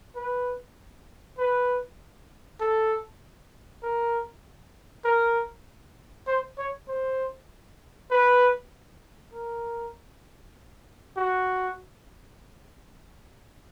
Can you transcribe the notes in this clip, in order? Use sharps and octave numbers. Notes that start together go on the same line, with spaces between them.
B4
B4
A4
A#4
A#4
C5
C#5
C5
B4
A#4
F#4